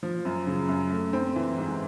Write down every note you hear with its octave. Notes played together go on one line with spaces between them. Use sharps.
F3
F#2
C#3
F#2
A3
C4
E3
G#2